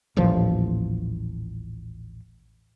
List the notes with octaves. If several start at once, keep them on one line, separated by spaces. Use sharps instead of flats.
D#1 A1 A#2 F3